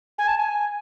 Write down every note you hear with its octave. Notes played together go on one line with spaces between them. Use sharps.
G#5
A5
G#5